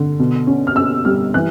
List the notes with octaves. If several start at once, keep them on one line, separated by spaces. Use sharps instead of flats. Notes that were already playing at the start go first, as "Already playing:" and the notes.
Already playing: D3
B2
C#4
F6
C#4 E6
G3 F6
E3 F#6